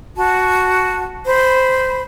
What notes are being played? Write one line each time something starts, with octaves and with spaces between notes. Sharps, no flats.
F#4 A5
C5 B5